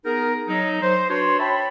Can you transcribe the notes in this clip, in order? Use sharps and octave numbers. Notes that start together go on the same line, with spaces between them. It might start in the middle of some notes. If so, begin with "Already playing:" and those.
B3 D#4 G#4 A#4
F#3 D#4
C5
D4 F#4 B4 C#5 C6
C#5 E5 G5 A5 B5